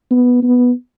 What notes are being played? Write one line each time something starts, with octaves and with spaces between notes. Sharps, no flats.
B3
B3